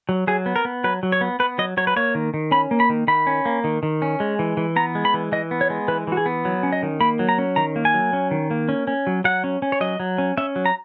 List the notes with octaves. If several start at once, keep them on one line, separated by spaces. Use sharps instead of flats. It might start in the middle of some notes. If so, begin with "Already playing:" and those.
F#3
F#3 G#4
B3
A#4
B3
F#3 B4
F#3
C#5
B3
B3 B4
F#3 D#5
F#3 C#5
B4
A#3 C#5
D#3
D#3
C#4 B5
A#3
B5
D#3
D#3 B5
C#4
A#3
D#3
D#3
C#4
G#3
E3
E3
B3 A#5
G#3
B5
E3
E3 D#5
B3
C#5
G#3
E3 B4
E3 F#4
G#4
B3
F#3
C#4
D#5
D#3
A#3 B5
F#3
A#5
C#4
D#3 A#5
A#3
G#5
F#3
C#4
D#3
A#3
C#4
C#4
F#3
F#3 F#5
C#4
C#4
C#5
F#3 D#5
F#3
C#4
C#4 E5
F#3
A#5